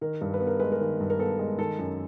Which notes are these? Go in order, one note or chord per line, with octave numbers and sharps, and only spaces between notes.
D#3 A#4
G2 A#4
B4
B3
A#4
G#3 B4
A#4
D#3
G2
A#4
B3 A4
G#3
D#3 A4
F#2